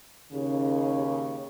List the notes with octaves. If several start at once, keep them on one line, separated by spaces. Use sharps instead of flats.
D#2 C#3